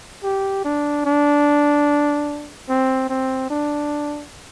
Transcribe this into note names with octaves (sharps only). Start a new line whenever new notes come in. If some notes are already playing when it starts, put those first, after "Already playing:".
G4
D4
D4
C4
C4
D4